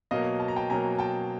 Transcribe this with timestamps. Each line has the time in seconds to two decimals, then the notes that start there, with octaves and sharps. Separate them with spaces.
0.11 B2 F#3 A#3 D#5 F5
0.40 A5
0.48 A#5
0.56 G5 A5
0.70 B2 F#3 A#3 G#5 A#5
0.99 G5 A5